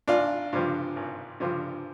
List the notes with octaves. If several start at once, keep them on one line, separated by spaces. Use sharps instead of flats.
G#1 D4 F4
G2 D3 F3
G#1
G2 D3 F3